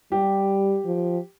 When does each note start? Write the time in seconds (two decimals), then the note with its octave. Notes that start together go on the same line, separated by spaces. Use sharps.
0.12 G3 G4
0.86 F3